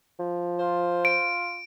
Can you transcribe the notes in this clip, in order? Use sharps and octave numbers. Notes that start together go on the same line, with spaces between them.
F3
F4 C5
D7